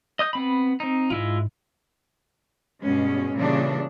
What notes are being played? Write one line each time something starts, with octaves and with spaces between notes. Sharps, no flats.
D#5 D#6 G6
B3 C4 B5
C4 D#4
G#2 G#3 E4 F4
G2 B2 G#3 C#4
A#2 C#3 E3 G3 D4